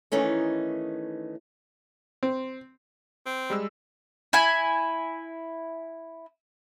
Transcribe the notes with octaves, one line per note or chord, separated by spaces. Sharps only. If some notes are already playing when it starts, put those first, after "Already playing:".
D#3 E3 A3 C#4 D#4
C4
C4
G3 G#3 E6
E4 G#5